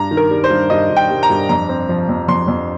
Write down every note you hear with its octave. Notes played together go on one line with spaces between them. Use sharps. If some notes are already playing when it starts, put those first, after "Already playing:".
Already playing: G2 A#5
D#3
A#4
G3
C5
G2
G2 D#5
G2
G5
G3
A#5
G2
F2 A#5
C4
F3
F2
F2 C6
F2